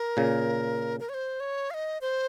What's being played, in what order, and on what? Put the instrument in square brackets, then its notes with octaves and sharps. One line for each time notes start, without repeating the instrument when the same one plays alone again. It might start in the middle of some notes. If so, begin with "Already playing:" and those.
Already playing: [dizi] A#4
[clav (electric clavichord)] A#2 C#3
[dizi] A#4
C#5
C5
C#5
F5
D#5
C5